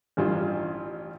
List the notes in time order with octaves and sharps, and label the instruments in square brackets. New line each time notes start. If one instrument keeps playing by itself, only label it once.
[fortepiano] A1 G2 F4